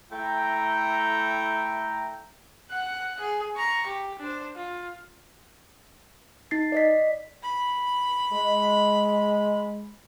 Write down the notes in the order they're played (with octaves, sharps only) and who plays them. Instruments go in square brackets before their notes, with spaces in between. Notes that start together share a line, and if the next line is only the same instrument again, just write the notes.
[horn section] A3 E4 G5 A#5
[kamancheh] F#5 F#6
G#4
A#5 C#6
G4
D4 C5
F4
[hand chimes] D#4 A6 C7
D5 D#5 B6
D5
[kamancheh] B5
[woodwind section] G#3